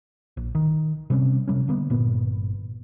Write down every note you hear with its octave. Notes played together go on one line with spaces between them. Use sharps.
A#1
D#3
C3 G3 C4 C#4
C3 G3 C#4
D3 A#3 B3
G1 A#2 B3